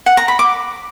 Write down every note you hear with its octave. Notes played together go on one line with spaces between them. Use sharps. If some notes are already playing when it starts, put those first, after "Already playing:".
F#5
A#5
B5
D6